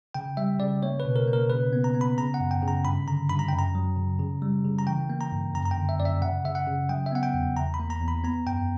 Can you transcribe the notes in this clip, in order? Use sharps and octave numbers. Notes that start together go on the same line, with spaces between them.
C#3 G5
G3 E5
C#3 D5
A#3 C#5
B4
B2
A#4
A#3
A#4
C#3 B4
B3
A#5
B3
B5
C#3 A#5
F#5
F#2
G5
C#3
A#5
G2 B5
D3 A#5
G2 B5
A#5
F#2 G5
A#5
F#3
C#3
C#3
G3
C#3
A#5
E3 G5
A#3
A#5
G2
F#2 A#5
A#5
G5
D3
E5
F#2 D5
E5
C#3 F#5
C#3 E5
F#5
C#3
F#3 G5
E5
B3 F#5
G5
E2
E2 A#5
B5
A#3
A#5
E2
B5
B3 A#5
F#2 G5